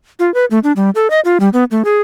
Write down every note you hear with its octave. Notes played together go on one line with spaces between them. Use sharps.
F4
B4
A3
D4
G3
A4
D#5
F4
G3
B3
A3
G#4